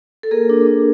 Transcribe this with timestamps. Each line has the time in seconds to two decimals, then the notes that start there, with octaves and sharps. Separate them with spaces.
0.23 A4
0.31 A#3 G#4 A#4
0.49 D4
0.67 D4